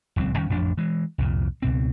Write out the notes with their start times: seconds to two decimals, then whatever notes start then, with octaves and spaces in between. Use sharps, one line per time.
0.16 D#1 C#2 F#3 C4
0.37 E2 D#3 G3 C#4
0.50 A1 F2 F3 D4
0.78 E3 G#3
1.18 C2 F2 A#2
1.62 C#2 B2 C4